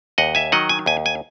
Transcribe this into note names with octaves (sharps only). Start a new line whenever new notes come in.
D#2 D#5 F#5
E5 G#5
D#3 F#3 D#5 F#5
G#5
D#2 G#5
G#5